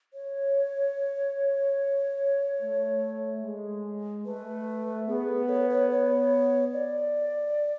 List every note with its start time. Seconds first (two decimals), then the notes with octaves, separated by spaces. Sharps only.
0.14 C#5
2.61 A3
3.43 G#3
4.26 A3 B4
5.08 B3 G#4
5.29 A4
5.49 C#5
5.70 C#5
5.90 C#5
6.73 D5